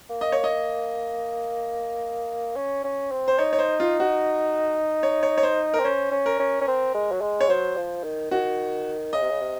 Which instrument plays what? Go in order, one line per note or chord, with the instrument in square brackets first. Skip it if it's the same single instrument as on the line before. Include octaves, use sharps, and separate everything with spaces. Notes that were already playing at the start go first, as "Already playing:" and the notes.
[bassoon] A#3
[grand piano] D#5
C#5
D#5
[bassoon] C#4
C#4
C4
[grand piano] C5
[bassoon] D#4 [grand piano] C#5
[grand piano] C#5
C5
F4
F#4
C#5
C#5
C#5
C5
A#4
[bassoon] C4
[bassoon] C#4 [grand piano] C5
[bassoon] C#4
[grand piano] A#4
[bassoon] C#4
C#4
C4
G#3
F#3
G#3
[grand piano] C#5
[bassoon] F#3 [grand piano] C5
[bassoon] F3
D#3
[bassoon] D#3 [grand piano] F#4
[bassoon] C#3 [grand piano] D#5
[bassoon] C3
C#3
C3